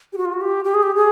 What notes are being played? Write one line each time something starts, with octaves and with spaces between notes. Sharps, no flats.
G4
F#4
F4
F#4
G4
G4
G#4
G4
G#4